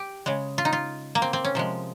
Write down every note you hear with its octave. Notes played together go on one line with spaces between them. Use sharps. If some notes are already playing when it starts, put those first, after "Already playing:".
Already playing: G4
C#3 G#3
F4
D#4
F4
A#3
C4
C4
C#4
C3 F3 G#3